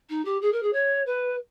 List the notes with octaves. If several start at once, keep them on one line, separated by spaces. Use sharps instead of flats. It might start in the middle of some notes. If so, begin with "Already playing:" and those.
D#4
G4
G#4
A#4
G#4
C#5
B4